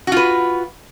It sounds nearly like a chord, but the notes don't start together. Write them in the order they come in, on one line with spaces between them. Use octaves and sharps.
F#4 F4 B4